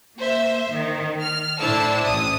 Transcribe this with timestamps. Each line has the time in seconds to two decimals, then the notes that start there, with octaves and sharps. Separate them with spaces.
0.18 A#3 C5 E5
0.73 D#3
1.21 F6
1.59 A2 D4 E4 C5 A5 E6
2.05 A1 D#6